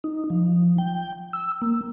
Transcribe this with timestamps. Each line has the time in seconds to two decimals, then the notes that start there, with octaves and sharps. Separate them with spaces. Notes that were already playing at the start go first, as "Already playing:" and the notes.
0.04 D#4
0.30 F3
0.78 G5
1.33 E6
1.62 A#3